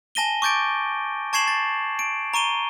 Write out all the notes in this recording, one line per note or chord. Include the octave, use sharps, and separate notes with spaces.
G#5 A5 A#6 D#7 G7
C#6 D6 G6 A6 D7
A5 C#6 G#6 C7 E7 F#7
A6
D7
A#5 C#6 D#7 G7